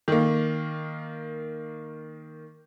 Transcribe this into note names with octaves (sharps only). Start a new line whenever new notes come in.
D#3 A#3